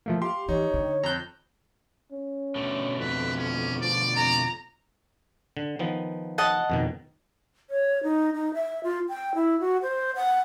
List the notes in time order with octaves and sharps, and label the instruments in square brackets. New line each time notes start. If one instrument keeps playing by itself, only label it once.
[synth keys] F3 A3 A#3
[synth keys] G4 [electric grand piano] F5 C6
[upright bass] E3 [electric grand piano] D#4 [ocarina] C#5
[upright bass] D3
[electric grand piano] F2 F#6 [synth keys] A#5 G6
[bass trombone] C#4
[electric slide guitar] B2 D3 A3
[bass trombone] F2 [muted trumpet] B4
[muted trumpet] C#4
[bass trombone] F3 [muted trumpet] D5
[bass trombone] F2 [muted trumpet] D5 [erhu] A#5
[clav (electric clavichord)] D3
D#3 F3 B3
[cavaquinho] D#5 F#5 A5
[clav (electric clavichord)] F2 B2 D#3
[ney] C#5
D#4
D#4
E5
F4
G5
E4
F#4
C5
F#5